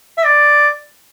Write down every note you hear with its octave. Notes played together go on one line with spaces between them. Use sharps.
E5
D5